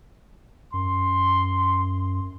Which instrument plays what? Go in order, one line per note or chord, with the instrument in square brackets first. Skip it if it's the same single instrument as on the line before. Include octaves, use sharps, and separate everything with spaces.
[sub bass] F#2 [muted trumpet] C6